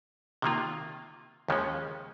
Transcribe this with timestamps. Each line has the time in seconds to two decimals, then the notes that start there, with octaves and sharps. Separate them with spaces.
0.42 C3 D#3 A#3 F4
1.48 D#2 C#3 F3 G#3 C#4